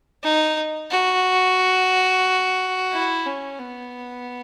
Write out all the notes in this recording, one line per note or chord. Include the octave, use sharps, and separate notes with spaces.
D#4
F#4
E4
C#4
B3